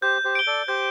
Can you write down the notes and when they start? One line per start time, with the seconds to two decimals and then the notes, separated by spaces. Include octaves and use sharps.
0.02 G4 C5 G6
0.25 G4 C5
0.35 D7 G7
0.47 A4 D5
0.68 G4 C5 G6